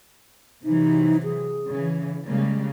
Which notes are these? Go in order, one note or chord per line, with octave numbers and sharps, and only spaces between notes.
C3 E3 F#3 D#4
G#4
C#3 E3
C#3 G3 G#3 A#3